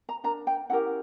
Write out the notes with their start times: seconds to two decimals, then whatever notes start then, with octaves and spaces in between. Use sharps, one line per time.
0.09 A#5
0.24 D4 A#4 A#5
0.47 G5
0.70 C#4 E4 G4 A#4 F#5